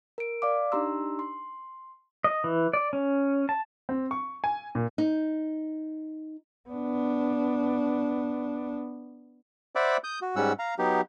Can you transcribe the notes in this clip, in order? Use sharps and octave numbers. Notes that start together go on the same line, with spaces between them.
A#4 D7
D5 F5 D6
D4 D#4 G4 A#5 C6 E6
C6
D#5
E3
D5
C#4
A5
C4
C#6
G#5
A#2
D#4
B3 D4
C5 D5 E5 F#5 B5 D6
D#6 G6
F#4
G#2 G3 C#4 F#5 E6
F5 A#5
F#3 B3 D#4 G4